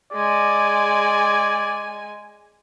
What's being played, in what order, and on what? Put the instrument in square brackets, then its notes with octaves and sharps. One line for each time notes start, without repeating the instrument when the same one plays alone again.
[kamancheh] G#3 G#5 [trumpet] D5